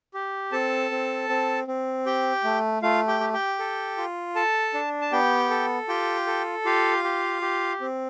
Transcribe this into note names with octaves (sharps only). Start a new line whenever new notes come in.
G4
C4 A4 A5
C4
C4
C4
G4 G5
A3
A3 F4 F5
G4 G5
G4
G4 G5
A4
F4
A4 A5
D4
A5
B3 G4 G5
A4
F4 G4 G5
A4
F4 G4 F5
G4
G4
C4